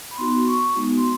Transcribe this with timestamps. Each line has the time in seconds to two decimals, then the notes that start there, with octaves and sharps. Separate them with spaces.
0.11 B5
0.18 B3 D#4 F#4 C6
0.47 C#6
0.75 G#3 B3 D#4 F#4
0.97 C6